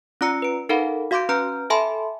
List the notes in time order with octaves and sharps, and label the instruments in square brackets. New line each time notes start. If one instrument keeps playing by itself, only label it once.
[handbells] C#4 F4 D5 A#5 E6 C#7
B4 D7
D#4 A4 A#4 F5 F#5 B5
F#4 F5 C6 D6 G6 D7
C#4 B4 A#5 F6 G6 D7
A4 E5 G#5 A5 B5 C6